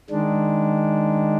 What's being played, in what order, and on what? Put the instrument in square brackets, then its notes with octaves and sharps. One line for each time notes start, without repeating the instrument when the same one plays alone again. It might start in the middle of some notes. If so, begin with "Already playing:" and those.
[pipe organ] D#3 G#3 D4